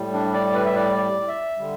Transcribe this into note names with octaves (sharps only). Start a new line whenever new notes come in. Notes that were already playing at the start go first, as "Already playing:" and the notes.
Already playing: A2 G3
D4
D5
B4
E5
D5
D5
E5
D3 G3